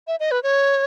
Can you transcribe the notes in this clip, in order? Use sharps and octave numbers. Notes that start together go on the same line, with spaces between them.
E5
D#5
B4
C#5